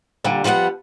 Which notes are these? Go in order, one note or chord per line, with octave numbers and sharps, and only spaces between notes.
A#2 D3 G3
F3 G3 B3 D5 F#5